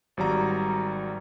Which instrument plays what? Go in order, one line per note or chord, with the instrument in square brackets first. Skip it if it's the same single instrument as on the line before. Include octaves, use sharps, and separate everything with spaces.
[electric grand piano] G#1 F#3 G3 A#5